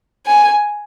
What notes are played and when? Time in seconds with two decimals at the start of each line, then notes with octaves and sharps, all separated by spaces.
0.26 G#5